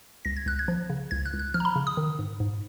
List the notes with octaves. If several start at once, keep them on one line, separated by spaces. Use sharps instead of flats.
C#2 A#6
G#6
C#2 F#6
G#6
F3
C#3
C#2 G#6
F#6
C#2
F#6
F3 F6
A#5
B5
C#3
D#6
D#3
G#2
G#2